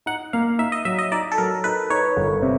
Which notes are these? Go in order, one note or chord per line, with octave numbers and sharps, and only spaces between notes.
D#4 F#5
A#3 F5
D#4 E5
D#5
F#3 E5
D#5
D#4 D5
A4
F#3 A#4
D#4 B4
D#4 C#5
G1
C3